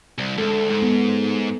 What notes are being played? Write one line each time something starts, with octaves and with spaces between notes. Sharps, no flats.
C2
D2 G#3 A4
G#2
B3